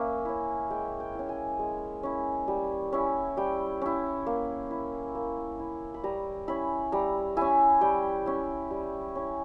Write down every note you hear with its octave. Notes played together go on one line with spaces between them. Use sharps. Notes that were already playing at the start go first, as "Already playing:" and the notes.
Already playing: A#3 C#4 E5 G#5
C#4 E4
G#3 G5
G5
C#4 E4
G#5
G#3
C#4 E4
G3
C#4 E4
G3 G5
C#4 E4
A#3
E4
A#3
E4
B5
G3 A#5
C#4 E4 B5
G3 A#5
C#4 E4 G#5
G3 G5
C#4 E4
G3
C#4 E4